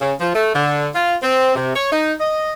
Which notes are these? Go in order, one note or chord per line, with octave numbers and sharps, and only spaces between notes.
C#3
F3
A3
D3
F4
C4
C3
C#5
D#4
D#5